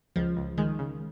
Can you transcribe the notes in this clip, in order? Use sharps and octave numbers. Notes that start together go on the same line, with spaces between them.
C#2 F3
C#2
D#3 G#3
C#3